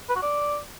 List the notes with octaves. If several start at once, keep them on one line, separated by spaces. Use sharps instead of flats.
B4
F#4
D5